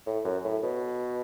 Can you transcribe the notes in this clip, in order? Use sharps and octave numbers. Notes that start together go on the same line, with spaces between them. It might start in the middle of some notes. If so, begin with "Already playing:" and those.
A2
F#2
A2
B2